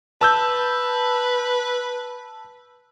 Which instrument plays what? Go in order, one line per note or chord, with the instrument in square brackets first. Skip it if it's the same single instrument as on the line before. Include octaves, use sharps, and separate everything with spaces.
[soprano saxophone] B4 [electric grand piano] A5 E6 G6